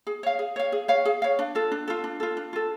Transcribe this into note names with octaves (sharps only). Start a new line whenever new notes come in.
G#4
C#5 F5
G#4
C#5 F5
G#4
C#5 F5
G#4
C#5 F5
D4
F4 A4
D4
F4 A4
D4
F4 A4
D4
F4 A4